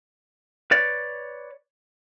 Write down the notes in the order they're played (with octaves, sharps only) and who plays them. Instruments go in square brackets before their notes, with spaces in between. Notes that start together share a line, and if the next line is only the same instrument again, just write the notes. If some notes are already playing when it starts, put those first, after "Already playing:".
[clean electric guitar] B4 C#5 D5